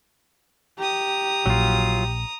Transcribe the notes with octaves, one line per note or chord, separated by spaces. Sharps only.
G4 A#5 D#6
A#1 F#3 F4